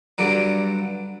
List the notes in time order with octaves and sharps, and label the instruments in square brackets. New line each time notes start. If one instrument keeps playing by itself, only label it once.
[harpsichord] G2 D3 F#3